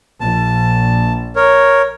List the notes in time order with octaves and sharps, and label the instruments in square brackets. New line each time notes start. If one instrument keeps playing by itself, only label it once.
[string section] A#1 [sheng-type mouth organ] A5
[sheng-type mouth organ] A#4 C#5